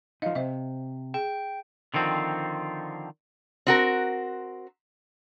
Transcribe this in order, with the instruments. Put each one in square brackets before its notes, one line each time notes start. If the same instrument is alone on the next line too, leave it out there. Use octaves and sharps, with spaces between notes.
[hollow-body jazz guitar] F3 D#4 [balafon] D#5 F5
[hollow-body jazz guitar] C3 [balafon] C5 D#5 E5
[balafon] G#4 [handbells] G5
[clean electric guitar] D3 D#3 F3 C4
[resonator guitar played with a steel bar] C4 F#4 A#4